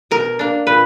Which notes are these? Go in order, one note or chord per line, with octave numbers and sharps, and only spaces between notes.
B2 A#4
A#3 D4
A#2 B4